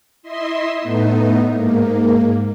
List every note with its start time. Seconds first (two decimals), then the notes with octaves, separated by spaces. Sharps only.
0.23 E4 D#5 E5 C6
0.80 A2 A3 B3 D#4
1.49 G#2 A#3